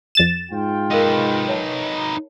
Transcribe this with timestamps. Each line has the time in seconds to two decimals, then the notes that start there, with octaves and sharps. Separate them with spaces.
0.15 F2 A6 E7
0.50 G#2 F4 G5
0.91 D#4 A#4 B4 F5 D6
1.49 C#5 E5 A5